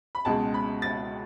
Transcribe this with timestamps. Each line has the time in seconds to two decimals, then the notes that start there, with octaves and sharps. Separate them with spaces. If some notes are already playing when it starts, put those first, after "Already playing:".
0.15 B5
0.25 C#2 B2 G#3 A5
0.54 B5
0.82 A6